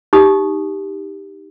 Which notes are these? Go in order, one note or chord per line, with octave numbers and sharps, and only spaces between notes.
D#4 G4 D#6